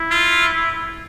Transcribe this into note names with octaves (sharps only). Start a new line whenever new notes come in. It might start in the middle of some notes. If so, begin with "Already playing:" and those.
Already playing: E4
F4